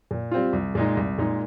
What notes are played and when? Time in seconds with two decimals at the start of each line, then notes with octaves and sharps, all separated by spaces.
0.11 A#2
0.31 G3 C4 F4
0.53 C2
0.75 A#2 G#3 D#4
0.97 C2
1.18 A#2 G#3 D#4